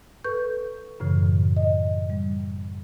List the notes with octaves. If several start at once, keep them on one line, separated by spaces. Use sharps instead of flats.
A4 B4 C#6 G6
F#2 A2 C#3 E3
D#5
G3